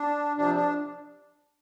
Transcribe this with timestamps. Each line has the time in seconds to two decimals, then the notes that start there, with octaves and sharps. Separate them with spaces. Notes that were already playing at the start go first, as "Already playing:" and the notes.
Already playing: D4
0.37 C3 F3 D4
0.55 D4